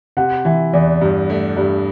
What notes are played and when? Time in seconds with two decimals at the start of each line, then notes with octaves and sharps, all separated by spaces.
0.17 C3 F#5
0.45 E3 E5
0.73 E2 D5
1.01 G2
1.30 A3
1.57 G2